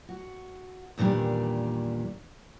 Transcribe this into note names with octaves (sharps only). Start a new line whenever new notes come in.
F#4
E2 A#2 D#3 G3 D4